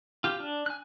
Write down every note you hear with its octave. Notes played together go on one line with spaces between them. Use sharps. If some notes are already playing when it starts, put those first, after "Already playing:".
F4 G4
D4
G#5 F#6